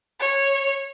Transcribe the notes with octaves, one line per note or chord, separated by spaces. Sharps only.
C#5